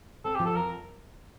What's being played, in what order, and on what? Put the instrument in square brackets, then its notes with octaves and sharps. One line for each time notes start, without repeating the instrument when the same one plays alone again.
[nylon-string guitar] C4 [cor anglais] A4
[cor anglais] G4
[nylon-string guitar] F3
[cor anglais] A4
[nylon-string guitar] F2 [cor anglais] A#4